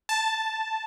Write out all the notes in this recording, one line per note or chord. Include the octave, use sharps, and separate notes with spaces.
A5